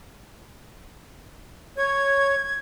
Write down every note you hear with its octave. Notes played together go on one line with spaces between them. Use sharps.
C#5 G#6